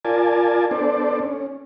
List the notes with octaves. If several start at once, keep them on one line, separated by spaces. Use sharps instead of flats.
F4 A#4 D5 G#5 A5
B3 D4 A4 C5 D5
C#4